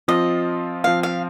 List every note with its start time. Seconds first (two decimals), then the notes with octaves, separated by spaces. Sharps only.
0.08 F3 C4 F4 D#5
0.84 F3 C4 F4 F5
1.03 F5